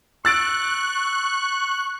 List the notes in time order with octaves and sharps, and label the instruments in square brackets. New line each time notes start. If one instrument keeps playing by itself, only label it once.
[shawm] C#6 [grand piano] E6 A6 D7 [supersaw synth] F#6